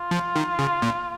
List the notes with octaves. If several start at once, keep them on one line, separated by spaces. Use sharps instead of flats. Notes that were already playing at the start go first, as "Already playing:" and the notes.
Already playing: F4
F3
D#3
C#3
A#2